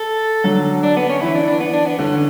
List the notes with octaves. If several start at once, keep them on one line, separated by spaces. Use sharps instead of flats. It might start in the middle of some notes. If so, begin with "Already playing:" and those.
Already playing: A4
D3 F#3
D4
B3
C#4
E3 E4
D4
D4
B3
D4
B3
D3 C#4